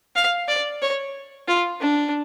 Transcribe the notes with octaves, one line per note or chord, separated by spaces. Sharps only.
F5
D5
C#5
F4
D4